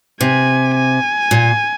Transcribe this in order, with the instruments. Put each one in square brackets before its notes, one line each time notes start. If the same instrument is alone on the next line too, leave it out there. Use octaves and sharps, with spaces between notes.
[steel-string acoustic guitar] C3 [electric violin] G#5
[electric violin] G#5
[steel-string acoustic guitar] A#2